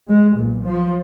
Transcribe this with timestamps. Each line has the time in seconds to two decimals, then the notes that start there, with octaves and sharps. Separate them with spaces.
0.09 G#3
0.36 B1 A#2
0.65 F3